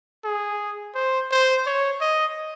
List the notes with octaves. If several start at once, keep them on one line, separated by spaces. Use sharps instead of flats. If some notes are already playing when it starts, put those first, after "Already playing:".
G#4
C5
C5
C#5
D#5